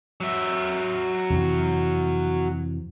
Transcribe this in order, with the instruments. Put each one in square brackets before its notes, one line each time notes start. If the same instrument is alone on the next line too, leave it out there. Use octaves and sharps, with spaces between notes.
[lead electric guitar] F#3 E5
[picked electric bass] F2 C3 E3